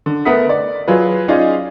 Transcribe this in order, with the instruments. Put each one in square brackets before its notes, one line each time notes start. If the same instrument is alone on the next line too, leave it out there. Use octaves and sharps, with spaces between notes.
[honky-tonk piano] D3
A3 B3 A#4 F#5 D#6 B6
D5
F#3 F4 G#4 B4
C#4 D#4 F4 G#4 D5 D#5